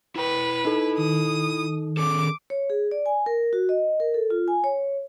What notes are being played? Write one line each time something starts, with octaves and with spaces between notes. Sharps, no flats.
E4 B4 G5
D#4 A4
D#3 D#6
C#4 G#4 A4 D6
C#5
G#4
D5
G#5
A#4
F#4
D#5
A#4
A4
F4
G#5
C#5